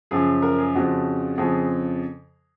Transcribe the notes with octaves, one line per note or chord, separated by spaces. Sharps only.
F#2 C#3 F3 G#4
A#4
G#4
F2 C#3 F3 F#4
F2 C#3 F3 G#4